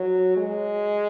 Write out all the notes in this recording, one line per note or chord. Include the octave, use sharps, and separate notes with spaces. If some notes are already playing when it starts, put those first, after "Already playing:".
Already playing: F#3
G#3